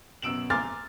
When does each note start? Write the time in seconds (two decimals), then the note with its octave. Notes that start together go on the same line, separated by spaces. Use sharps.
0.22 F#2 B2 E6 D7 E7 F#7
0.50 G#5 A#5 C6 D6 F6 A6